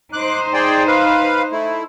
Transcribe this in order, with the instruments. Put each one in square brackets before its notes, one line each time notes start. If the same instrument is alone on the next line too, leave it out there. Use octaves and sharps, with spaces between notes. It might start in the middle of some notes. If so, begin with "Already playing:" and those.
[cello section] D#4 C5 [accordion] D6 F#6
[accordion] G#4 D5 G5
B4 F5
A3 E4